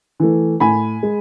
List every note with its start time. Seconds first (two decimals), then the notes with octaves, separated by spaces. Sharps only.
0.20 E3 A3
0.60 A2 G#5 B5
1.03 G#3